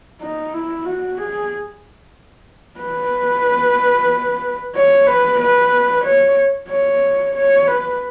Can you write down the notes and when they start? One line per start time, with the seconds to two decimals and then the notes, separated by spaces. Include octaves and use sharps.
0.21 D#4
0.53 E4
0.85 F#4
1.18 G#4
2.80 B4
4.75 C#5
5.07 B4
5.40 B4
6.04 C#5
6.70 C#5
7.35 C#5
7.67 B4